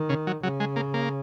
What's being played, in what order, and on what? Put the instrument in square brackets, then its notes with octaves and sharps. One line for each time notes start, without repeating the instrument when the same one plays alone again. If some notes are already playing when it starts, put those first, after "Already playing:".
Already playing: [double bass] D#3
[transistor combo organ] C#3
F#3
[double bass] C#3 [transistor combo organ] F#3
[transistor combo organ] G#3
A#3
A#3